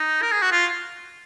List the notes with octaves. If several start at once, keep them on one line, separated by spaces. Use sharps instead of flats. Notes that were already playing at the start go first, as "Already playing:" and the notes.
Already playing: D#4
A#4
G#4
F#4
F4